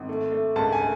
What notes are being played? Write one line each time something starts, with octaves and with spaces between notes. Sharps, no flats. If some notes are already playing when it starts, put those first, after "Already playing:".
Already playing: G#1
A3
A3
C#2 A5
G#5
A3